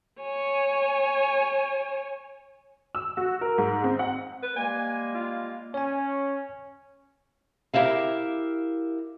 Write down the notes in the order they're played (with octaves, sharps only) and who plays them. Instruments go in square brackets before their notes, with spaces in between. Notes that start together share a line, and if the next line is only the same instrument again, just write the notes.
[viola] C#5 G#5
[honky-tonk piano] E6
F#4
A#4
G#2
C4
F#5
[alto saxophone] B4
[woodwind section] G3 G#3 A#3 [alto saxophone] G#5
[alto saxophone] F4
[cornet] C#4 [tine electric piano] C#5 G#5
[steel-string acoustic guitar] E4 G4 A#4 E5 F5